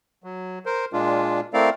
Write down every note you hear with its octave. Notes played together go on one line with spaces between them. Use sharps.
F#3
A#4 C5
A#2 G#3 D4 F4
A3 C4 E4 A#4 D5 F5